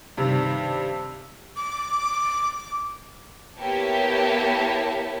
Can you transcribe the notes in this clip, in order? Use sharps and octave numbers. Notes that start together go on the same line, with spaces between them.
G2 C3 D#3
D6
A#3 B3 E4 G4 C#5 A5